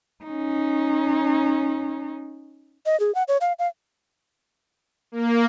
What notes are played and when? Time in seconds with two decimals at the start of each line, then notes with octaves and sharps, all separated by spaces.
0.24 C#4 D#4
2.86 D#5
3.00 G#4
3.15 F#5
3.28 C#5
3.41 F5
3.59 F5
5.12 A#3